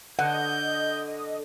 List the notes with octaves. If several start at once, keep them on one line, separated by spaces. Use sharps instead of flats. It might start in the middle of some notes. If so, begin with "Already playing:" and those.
D3 D#5 F#5 G6